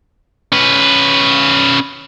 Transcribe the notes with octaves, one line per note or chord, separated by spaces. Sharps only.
C#4 B4